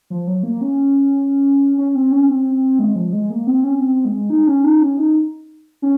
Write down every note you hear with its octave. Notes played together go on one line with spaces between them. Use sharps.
F3
F#3
A#3
C#4
C#4
C4
C#4
C4
G#3
F3
G#3
A#3
C4
C#4
C4
G#3
D#4
C#4
D#4
C#4
D#4
C#4